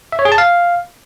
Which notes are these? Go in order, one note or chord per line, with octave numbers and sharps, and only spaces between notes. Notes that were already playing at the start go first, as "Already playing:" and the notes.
E5
C#5
G#4
A5
F5